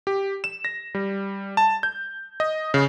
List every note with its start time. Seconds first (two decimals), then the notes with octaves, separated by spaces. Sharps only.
0.07 G4
0.44 E7
0.65 A#6
0.95 G3
1.57 A5
1.83 G6
2.40 D#5
2.74 C#3